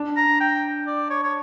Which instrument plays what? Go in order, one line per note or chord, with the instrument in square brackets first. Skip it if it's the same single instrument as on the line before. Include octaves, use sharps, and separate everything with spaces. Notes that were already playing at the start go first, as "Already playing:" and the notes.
Already playing: [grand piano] D4
[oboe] A#5
G5
D5
C#5
C#5